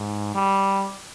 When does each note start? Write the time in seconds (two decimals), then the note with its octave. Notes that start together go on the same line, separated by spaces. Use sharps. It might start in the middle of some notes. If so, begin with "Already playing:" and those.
Already playing: G#2
0.35 G3